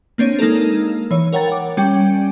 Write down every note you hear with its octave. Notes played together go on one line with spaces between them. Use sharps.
A#3 C4 D4 C#5 D#7
G#3 A#3 D#4 A4 A#4
E3 C#5
A#4 C#5 F#5 G5 A#5 A6
F#5 D6
G3 C#4 G5